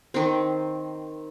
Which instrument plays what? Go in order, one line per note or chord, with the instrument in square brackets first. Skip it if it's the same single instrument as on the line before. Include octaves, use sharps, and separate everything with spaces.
[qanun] D#3 C4